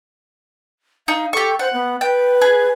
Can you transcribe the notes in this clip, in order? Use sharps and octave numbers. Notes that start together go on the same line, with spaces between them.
D#4 F5
G4 A4 C#6
C5 F#5
B3
B4 G5
G#4